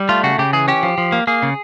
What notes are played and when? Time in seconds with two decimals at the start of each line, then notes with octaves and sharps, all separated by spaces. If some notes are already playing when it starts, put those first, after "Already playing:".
Already playing: G3
0.09 A3 F4
0.24 C#3 F#4
0.38 C#3 G4
0.53 E3 G#4
0.68 C#4 G4
0.83 F3
0.98 F3
1.12 A#3
1.27 A#3 G#4
1.43 C#3